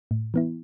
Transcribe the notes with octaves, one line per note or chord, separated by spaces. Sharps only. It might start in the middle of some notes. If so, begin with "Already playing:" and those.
A2
E3 B3 E4